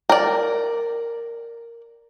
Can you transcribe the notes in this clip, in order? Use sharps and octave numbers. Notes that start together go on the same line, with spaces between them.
A#4 D5